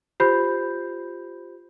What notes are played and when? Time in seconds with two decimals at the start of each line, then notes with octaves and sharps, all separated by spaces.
0.20 F4 G4 C5 B5 G6